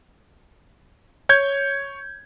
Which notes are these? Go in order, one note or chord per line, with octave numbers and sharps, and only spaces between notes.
C#5 G6 G#6